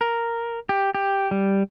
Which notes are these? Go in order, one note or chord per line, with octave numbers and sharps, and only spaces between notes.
A#4
G4
G4
G3